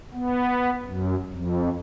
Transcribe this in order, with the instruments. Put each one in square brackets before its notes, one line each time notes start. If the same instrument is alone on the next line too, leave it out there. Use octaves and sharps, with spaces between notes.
[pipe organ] B3
F#2
F2